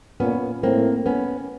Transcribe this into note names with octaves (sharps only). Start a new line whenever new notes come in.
A#2 B3 C#4
A2 A#3 C4
B3 C#4